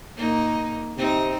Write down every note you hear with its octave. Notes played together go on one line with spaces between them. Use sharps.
A#2 A#3 D#4
C3 C4 D#4